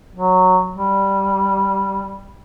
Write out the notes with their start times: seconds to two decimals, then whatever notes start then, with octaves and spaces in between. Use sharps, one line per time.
0.15 F#3
0.75 G3